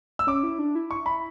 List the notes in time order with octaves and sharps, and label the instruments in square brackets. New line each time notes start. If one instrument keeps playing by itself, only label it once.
[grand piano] E6
[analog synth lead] C#4 [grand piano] D6
[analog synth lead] E4
D4
E4
[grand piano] C#6
B5